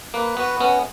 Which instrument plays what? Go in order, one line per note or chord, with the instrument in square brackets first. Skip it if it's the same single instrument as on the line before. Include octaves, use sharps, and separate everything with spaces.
[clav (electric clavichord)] A#3 [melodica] B4
[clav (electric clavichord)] B3 [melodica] F#4
[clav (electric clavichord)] B3 [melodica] C#4